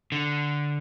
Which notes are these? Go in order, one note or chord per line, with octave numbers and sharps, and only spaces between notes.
D3